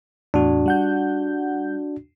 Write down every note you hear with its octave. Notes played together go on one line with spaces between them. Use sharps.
E2 A2 D4 F#4
G3 F#5 G6